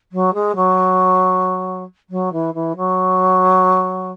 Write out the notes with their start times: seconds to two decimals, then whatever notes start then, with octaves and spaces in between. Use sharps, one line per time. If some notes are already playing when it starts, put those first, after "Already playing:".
0.12 F#3
0.34 G#3
0.55 F#3
2.09 F#3
2.32 E3
2.54 E3
2.76 F#3